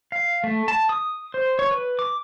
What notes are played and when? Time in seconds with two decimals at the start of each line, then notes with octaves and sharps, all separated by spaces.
0.12 F5
0.44 A3
0.68 A5
0.89 D#6
1.34 C5
1.59 C#5
1.71 B4
1.99 D6